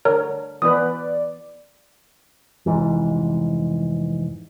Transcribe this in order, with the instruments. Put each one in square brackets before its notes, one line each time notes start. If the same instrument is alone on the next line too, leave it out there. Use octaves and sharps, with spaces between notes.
[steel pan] D3 [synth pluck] A#4 [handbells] C#5
[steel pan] E3 B3 B4 [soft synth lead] D5 [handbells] D#6
[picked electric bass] F1 C2 G#2 E3